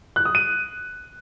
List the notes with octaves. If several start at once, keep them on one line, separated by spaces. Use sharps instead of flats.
F#6
D#6
D#7